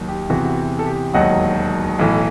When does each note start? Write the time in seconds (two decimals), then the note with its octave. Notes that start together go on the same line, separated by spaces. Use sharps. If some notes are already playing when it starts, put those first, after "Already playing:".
Already playing: D#2 D#3 F#3
0.08 G4
0.30 E2 C3 E3 F#4
0.45 F#4
0.79 A4
0.86 G4
1.14 E1 D#2 D#3 F#3 D#5 F#5
1.99 B1 A2 E3